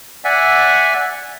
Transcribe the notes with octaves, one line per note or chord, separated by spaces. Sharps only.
D5 E5 F#5 G#5